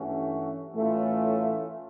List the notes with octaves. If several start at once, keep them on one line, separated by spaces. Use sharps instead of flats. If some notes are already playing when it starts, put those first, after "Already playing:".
Already playing: G2 E3 A3 C#4 F#4
A2 E3 A3 C#4 F4